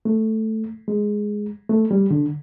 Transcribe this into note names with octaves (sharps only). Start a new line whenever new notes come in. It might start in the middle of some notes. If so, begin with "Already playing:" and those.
A3
G#3
A3
G3
D3